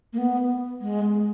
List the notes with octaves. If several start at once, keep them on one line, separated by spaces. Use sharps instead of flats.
A#3
B3
G#3